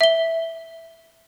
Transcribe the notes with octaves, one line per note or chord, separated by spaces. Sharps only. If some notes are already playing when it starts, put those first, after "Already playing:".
E5 G7